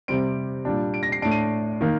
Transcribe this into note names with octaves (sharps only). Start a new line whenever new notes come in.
C3 G3 C4 D7
A#2 G3 D4
D7
A#6
C7
A2 A3 D4 D7
D#7
D#3 A#3